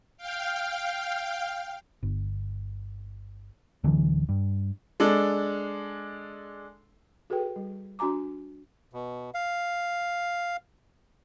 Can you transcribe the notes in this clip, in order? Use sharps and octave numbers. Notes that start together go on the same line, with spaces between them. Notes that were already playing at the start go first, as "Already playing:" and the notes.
F5 G5
G1
D1 D3 E3 F#3
G2
G#3 D4 A4
F#4 G#4 A4 B4 G5
G3
D4 F#4 G#5 A#5 D6
B2
F5